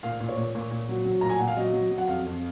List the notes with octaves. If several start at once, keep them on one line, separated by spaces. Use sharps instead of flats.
A#2 F5
A#2
C#5
A#2
A#2
A#2
F#3
F#3
A#2 A#5
G#5
A#2 F#5
F5
F#3 D#5
F#3
F#3
F#5
F2 F5
F2